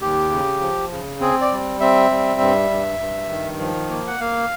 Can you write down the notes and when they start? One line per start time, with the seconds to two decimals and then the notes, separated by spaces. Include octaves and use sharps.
0.01 D#2 G4
0.31 C#3
0.61 F3
0.92 C#3
1.20 C4 G#4
1.41 D5
1.51 G3
1.80 C4 E5
2.10 G3
2.40 G2
2.71 G2
3.00 G2
3.30 D#3
3.60 F3
3.90 A#3
4.07 F#5
4.20 A#3 F5